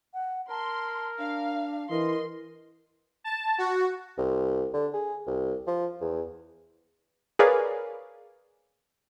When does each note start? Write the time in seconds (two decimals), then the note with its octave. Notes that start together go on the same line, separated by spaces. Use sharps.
0.14 F#5
0.50 A#4 A5 C6
1.19 D4 F5
1.90 E3 A#4 D#5 C6
3.24 A5
3.58 F#4
4.18 C2
4.74 D3
4.94 G#4
5.27 C2
5.67 F3
6.01 E2
7.39 G#4 A#4 B4 C#5 D5 F5